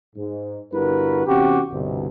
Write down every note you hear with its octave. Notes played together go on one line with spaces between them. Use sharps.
G#2
G1 G2 E4 F#4 A#4 B4
E2 C3 C#4 F#4 G4
G1 C2 B2